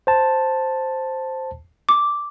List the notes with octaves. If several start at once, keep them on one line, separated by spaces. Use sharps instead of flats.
C5 A5
D6